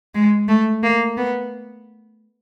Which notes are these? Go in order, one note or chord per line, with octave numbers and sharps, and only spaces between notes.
G#3
A3
A#3
B3